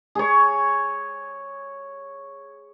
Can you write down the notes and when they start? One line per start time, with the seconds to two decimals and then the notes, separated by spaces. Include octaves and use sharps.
0.15 G#4 C#5